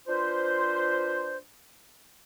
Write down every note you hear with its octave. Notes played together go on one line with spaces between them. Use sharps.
D4 F4 B4 C5